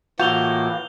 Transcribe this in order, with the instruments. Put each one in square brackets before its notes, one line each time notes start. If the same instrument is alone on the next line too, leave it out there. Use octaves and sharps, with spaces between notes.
[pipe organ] A2 E3 A#3 [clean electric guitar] F4 F#4 [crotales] G6 F7 G7